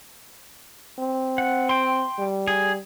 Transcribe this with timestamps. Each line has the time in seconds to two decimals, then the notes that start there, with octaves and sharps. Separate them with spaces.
0.99 C4
1.38 F#5
1.69 G5 C6
2.19 G3
2.47 G#4